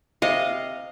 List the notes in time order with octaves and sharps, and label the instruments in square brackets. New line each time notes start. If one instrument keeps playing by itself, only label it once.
[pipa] C3 [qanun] D#5 F5